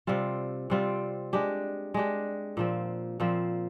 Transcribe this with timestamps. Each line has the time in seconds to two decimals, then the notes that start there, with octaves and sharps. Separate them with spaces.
0.07 C3 G3 C4 F4
0.70 C3 G3 C4 F4
1.33 G#3 D4 G4
1.94 G#3 D4 G4
2.57 A#2 F3 C4
3.20 A#2 F3 C4